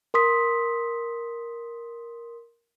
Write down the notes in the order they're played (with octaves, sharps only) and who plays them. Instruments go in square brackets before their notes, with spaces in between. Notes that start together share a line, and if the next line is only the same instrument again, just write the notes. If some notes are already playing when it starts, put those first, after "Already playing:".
[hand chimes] A#4 C6 D#6 B6